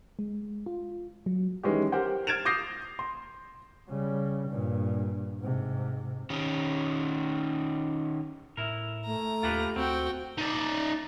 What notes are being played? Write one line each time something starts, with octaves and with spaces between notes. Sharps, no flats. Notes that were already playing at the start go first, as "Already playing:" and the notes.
G#3
F4
F#3
D#3 E3 G#3 C#4 G4
G4 A#4 C5 F#5 G5
F6 G#6 A6 D7 E7 F7
D6 D#6 G6 A#6 C7
C6
C#3 G3
G2 A#2
G#2 C3
D#3 C#4
A2 E4 A#4
A3 A#5
D#2 F4 G4 B4
D2 C4 F#4 G5
D#4 D5